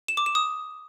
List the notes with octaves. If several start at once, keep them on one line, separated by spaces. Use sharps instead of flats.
E7
D6
E7
D#6